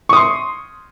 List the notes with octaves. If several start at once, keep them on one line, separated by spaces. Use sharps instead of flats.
C6 C#6 D#6